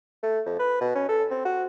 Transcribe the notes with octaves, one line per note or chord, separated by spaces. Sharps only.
A3
F2
B4
B2
C#4
A4
C4
F#4